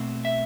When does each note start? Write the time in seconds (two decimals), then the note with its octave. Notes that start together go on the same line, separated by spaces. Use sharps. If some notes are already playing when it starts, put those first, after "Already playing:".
Already playing: B2 A3 C4
0.25 E5